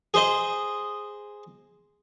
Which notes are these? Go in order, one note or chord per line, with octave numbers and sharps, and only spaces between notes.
G#4 C5 D#5